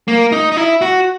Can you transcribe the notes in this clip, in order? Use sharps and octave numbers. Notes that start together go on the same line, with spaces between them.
A#3
D#4
D#4
E4
F#4